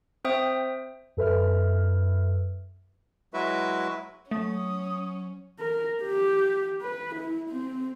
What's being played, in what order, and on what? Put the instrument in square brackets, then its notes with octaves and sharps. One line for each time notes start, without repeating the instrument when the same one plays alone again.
[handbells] C4 C5 E5 G5 D#6
[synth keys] F#2 A4 B4 E5 F6
[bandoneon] F#3 G#3 E4 F#4 B4 E5
[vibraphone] F#3 [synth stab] A3 [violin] C#4 [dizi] D#6
[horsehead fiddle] A#4
G4
B4
E4
C4